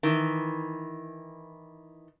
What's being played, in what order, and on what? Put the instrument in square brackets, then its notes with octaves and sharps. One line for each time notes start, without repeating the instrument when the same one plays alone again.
[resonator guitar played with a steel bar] D#3 E3